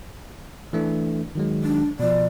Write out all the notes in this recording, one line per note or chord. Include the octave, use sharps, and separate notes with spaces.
E3 A3 D4
D#3 F#3 G#3
D4
B2 F3 D5